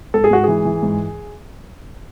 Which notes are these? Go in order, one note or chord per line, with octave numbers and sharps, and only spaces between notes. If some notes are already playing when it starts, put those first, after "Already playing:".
G#2 A4
G#4
G#2 F#4
E3 G#4
E3
G#2